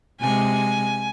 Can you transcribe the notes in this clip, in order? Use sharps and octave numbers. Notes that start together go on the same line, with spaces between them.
C3 G#3 G#5